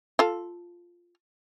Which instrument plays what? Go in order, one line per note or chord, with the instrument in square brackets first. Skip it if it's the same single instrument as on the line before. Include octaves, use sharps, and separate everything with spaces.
[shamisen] F4 A4